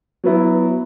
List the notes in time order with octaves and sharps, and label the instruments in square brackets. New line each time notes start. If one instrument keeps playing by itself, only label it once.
[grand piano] F#3 B3 E4